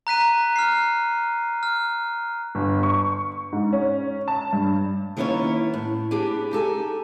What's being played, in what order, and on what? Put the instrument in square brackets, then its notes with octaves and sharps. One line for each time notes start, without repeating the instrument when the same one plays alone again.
[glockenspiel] A#5 F#6 B6 D#7
F6 C7
F6
[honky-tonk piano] G1
C#6
G#2
C#4
A5
G2
[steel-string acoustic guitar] D#3 A#3 B3 C#4 E4 C#5
A2
B3 D4 G4 G#4
D#4 G4 A4 G#5